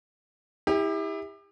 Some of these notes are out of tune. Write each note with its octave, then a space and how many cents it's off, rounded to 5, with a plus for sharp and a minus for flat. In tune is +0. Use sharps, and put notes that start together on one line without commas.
E4 -25 G4 +35